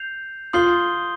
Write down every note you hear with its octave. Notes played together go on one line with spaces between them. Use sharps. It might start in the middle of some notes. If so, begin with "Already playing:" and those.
Already playing: G6 C7 F7
F4 C6 D#6 G6 C7 G7